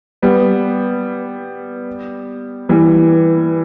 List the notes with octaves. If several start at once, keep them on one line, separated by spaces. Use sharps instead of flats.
G3 B3
E3 G3